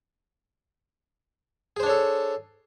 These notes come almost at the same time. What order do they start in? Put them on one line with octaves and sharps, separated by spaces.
G#4 C5 D4 C#5 A4